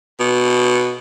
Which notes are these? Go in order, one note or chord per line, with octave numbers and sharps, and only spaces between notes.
B2